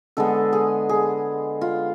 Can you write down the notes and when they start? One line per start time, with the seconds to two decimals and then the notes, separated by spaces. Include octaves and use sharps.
0.17 D3 G#3 B3 A4
0.53 G#4
0.89 G#4
1.61 F4